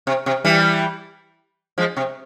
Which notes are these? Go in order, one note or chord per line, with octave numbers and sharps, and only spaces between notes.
C3
C3
E3 G3
F3 G#3
C3